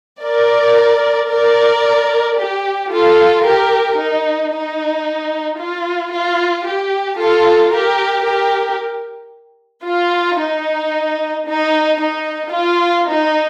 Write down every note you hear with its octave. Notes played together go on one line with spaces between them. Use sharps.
A#4 D5
A#4 D5
G4
F4 A4
G4 A#4
D#4
D#4
F4
F4
G4
F4 A4
G4 A#4
G4 A#4
F4
D#4
D#4
D#4
F4
D#4